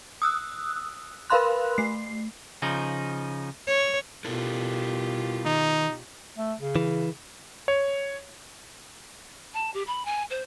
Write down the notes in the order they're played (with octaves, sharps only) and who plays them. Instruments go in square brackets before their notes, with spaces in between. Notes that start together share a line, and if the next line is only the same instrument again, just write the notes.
[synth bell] D#6 E6 F#6
A#4 B4 F5 B5 C6 F#6
A3 C7
[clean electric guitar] C#3 F3 D#4
[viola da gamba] C#5
[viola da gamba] B2 F4 G4 [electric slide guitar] E4 A4 A#4
[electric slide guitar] D#3 [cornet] D#4
[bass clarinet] A3
C#3
[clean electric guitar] E3
[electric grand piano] C#5
[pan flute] A5
G4
B5
G#5
C5